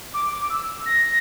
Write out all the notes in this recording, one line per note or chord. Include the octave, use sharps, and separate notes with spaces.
D6
D6
E6
A#6